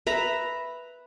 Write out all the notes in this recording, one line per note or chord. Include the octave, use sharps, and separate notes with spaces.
B4 E5 A#5